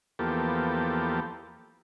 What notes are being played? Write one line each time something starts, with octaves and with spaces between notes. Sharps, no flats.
E2 F3 A#3 B3 G4 A4